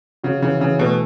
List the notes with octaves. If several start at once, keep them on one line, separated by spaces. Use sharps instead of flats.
C#3 F#4
C#3 E3
C#3 E3
B2 A3